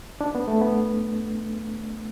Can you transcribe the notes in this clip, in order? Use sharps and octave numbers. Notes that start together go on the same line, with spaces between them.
D4
B3
A3
B3